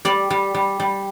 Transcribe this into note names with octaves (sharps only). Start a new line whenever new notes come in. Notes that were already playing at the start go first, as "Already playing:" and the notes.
G3 D5
G3
G3
G3